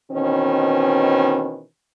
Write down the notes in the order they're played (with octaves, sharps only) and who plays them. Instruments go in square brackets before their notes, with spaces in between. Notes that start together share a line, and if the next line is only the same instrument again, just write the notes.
[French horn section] B2 D#3 E3 C4 C#4